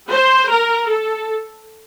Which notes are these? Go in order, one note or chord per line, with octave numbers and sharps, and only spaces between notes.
C5
A#4
A4